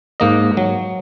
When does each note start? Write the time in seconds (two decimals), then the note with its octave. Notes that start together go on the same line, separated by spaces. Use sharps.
0.20 G#2 A#3 D#5
0.57 F#3